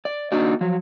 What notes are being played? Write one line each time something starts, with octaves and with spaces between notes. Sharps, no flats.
D5
A#3 D4 D#4 F#4 D5
F3 F#3